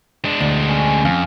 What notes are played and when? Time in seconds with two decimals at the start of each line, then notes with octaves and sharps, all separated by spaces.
0.25 G#3 D4
0.41 D2
0.69 C#4
1.05 F2 F5